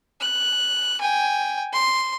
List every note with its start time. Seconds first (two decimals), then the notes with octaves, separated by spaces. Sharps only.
0.21 F#6
1.01 G5 G#5
1.73 C6